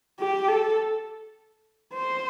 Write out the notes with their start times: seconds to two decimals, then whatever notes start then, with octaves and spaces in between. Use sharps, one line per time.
0.19 G4
0.48 A4
1.94 C5